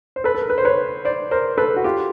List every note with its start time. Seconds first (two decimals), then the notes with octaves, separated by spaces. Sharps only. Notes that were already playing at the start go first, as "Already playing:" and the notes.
0.16 C5
0.24 A4 B4
0.34 A4
0.42 A#4
0.50 B4
0.58 C5
0.65 B4 C#5
1.05 C5 D5
1.31 A#4 C5
1.58 A4 B4
1.76 F#4
1.84 F4 G4